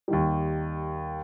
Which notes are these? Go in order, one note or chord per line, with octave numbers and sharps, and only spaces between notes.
D#2 D#3 G3